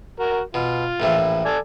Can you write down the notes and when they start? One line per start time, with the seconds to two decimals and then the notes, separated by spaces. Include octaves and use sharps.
0.20 F#4 A#4
0.54 B2 F4
1.00 A#1 A2 E3
1.46 A4 D5 G#5